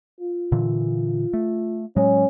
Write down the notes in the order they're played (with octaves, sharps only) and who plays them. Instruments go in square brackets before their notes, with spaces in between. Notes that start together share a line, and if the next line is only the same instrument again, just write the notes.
[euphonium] F4
[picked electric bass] A#2 D3 E3
A3
[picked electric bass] A2 F#3 G#3 [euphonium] C#4